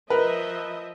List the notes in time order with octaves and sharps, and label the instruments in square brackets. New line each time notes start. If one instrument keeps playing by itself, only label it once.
[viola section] F3 D#5 E5 [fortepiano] A#4 B4